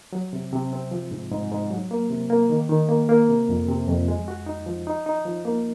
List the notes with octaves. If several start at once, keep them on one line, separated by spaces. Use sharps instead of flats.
F#3
C3
C3
C4
F3
G#2
G#2
G#2
F#3
A#3
C3
A#3
D#3
D#3
A#3
A#3
C3
F2
C3
F2
G#3
F#4
D#4
F3
D#4
D#4
F3
A#3